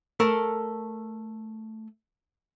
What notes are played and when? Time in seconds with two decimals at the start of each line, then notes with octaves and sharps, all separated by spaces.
0.20 A3 A4 A#4